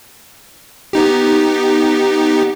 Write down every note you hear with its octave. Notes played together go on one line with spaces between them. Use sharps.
B3 D#4 G4